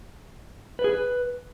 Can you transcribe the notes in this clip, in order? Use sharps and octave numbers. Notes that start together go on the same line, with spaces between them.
B4
G#4
B4